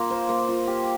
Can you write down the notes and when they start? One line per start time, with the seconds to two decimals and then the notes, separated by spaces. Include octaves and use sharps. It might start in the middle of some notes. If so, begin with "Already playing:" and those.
Already playing: A#3 F4
0.10 C5
0.29 A#3
0.48 F4
0.67 G4